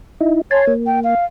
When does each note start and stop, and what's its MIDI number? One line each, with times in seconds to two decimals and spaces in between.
0.21 0.41 63
0.21 0.41 64
0.51 0.73 73
0.51 0.65 80
0.51 0.65 81
0.51 0.65 84
0.67 1.15 58
0.86 1.00 79
1.04 1.25 77